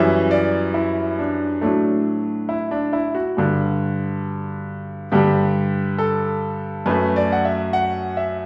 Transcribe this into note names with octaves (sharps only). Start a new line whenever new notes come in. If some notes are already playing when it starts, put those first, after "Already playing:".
Already playing: F#2 E3 G3 E5
D5
E4
D4
A2 F#3 A3 D4
E4
D4
E4
F#4
G2 D3 G3
G2 D3 G3 G4
A4
F#2 F#3 A3 B4
D5
F#5
E5
F#5
E5